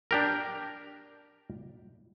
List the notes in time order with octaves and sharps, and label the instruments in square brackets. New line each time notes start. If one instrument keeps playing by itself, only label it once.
[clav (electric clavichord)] D4 G4 A#4